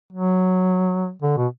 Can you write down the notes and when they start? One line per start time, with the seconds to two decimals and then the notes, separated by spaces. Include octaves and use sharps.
0.13 F#3
1.22 D3
1.37 B2